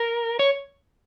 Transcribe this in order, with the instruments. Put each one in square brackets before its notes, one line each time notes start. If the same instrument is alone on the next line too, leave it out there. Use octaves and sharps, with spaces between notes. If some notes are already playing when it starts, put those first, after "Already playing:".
Already playing: [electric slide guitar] A#4
C#5